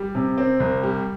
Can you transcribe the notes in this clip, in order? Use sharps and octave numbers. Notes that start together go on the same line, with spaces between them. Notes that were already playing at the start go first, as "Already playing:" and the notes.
Already playing: G3
C3
C4
C2
G3